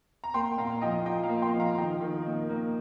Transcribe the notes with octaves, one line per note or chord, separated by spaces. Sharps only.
A#5
A#3 G5 C6
G5
A#2 F5 A#5
F3 D#5 G5
F3 D#5 G5
F5 A#5
A#3
G5 C6
F3
F5 A#5
D#3 D#5 G5
D#3
A#3
A#3